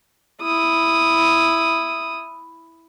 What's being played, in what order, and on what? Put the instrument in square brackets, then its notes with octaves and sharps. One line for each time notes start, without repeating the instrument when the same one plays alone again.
[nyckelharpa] E4 D#6